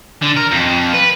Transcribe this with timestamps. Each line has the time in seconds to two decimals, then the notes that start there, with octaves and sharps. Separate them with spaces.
0.22 D3
0.36 A#4
0.51 F2
0.93 B4